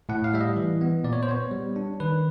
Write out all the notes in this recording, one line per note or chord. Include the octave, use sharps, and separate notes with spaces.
A2 F#5
F5
G3 E5
D#5
E3
B3
A#2 D5
C#5
C5
B3 C#5
G3
D4
D#3 B4